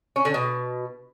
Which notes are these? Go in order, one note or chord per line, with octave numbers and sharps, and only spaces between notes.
C#4
D3
B2